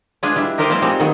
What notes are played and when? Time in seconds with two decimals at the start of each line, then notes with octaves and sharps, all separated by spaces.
0.23 G#3 D4 F4 G#4 B4
0.36 G3 D4 E4
0.58 D#4 G4 A#4 C5 D5 D#5
0.70 F3 G3 G#3 C4 C5 F5
0.82 F3 G3 G#3 C4 D#4
1.00 D#3 F#3 B3